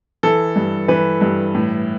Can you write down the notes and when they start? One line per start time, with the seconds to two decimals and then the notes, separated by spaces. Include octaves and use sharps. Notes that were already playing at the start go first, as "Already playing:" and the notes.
0.23 E3 A4
0.56 G2
0.88 E3 B4
1.21 G2
1.54 A2